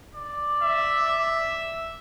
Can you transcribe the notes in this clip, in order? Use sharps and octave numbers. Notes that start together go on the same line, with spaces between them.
D5
E5